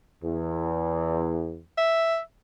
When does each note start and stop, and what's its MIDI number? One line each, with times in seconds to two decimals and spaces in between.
0.24 1.60 40
1.78 2.19 76